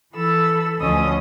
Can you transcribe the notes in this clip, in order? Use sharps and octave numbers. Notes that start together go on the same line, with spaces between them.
E3 A4 B5 E6
D2 F3 C#4 D#5 D#6